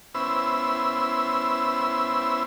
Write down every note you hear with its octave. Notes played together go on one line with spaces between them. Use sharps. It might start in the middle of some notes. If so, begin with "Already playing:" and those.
B3 C#4 E4 C5 B5 E6